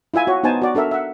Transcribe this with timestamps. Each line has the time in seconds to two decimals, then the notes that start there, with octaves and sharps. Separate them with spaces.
0.14 E4 F4 E5 G#5
0.27 F#4 C#5
0.43 B3 D#4 C5 G#5 A5
0.62 F#4 D5
0.75 D4 A4 A#4 E5
0.91 E5 F#5